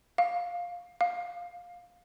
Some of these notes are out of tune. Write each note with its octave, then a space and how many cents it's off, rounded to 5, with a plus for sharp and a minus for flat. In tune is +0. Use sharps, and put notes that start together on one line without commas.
F5 +10
F5 +15